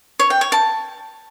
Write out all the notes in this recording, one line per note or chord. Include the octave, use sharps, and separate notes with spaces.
C#5
G5
C#5
A5